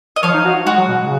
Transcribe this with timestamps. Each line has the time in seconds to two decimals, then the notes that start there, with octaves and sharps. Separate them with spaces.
0.16 D#5
0.23 F3 C#5 F5
0.34 D#4
0.45 F#4
0.66 G#3 F#4
0.77 F#3
0.88 B2
0.98 C#3